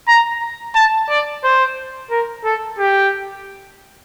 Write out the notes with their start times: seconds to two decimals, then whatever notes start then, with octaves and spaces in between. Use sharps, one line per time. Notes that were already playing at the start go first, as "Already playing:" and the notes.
0.08 A#5
0.75 A5
1.10 D5
1.44 C5
2.11 A#4
2.45 A4
2.79 G4